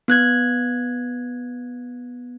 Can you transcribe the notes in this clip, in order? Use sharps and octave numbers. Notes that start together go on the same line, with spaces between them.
B3 F#6 G#6